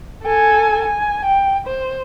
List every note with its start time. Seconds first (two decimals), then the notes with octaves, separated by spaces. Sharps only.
0.23 A4 G#5
0.85 G#5
1.26 G5
1.67 C5